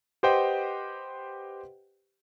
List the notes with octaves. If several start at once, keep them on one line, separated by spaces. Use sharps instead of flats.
G4 B4 C5 D#5 F#5 G5